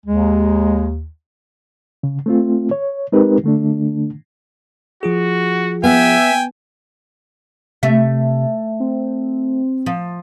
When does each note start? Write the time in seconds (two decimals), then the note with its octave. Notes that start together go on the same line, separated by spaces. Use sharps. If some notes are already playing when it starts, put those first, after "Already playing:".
0.06 D#2 G#3
2.03 C#3
2.26 A3 C4 F4
2.71 C#5
3.12 G#3 C4 D#4 G4 A#4 B4
3.44 D3 A3 D4
5.03 F3 F4 F#4 G#4
5.84 B3 E5 G5 G#5
7.83 C3 A3 E5
8.80 C4
9.86 F3